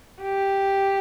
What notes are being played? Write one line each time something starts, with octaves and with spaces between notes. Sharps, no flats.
G4